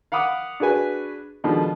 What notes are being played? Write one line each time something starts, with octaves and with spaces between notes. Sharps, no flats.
F5 F#5 B5 D6 D#6
D4 F#4 G#4 B4 G#5
B2 D3 D#3 F3 G#3